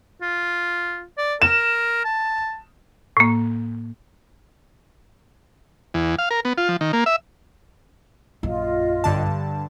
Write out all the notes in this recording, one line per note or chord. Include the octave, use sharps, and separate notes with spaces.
F4
D5
A#4 E7
A5
A2 A#3
E2
F5
A#4
B3
F4
F3
D#3
A#3
E5
A#1 F#2 F4 D#5
G2 D3 A5